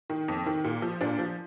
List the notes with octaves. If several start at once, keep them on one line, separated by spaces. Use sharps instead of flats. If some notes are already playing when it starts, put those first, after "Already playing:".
D#3
F2
D#3
A#2
F3
A#2 D4
F3